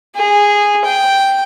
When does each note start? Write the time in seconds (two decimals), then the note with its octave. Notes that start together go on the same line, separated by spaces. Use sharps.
0.15 G#4
0.84 G5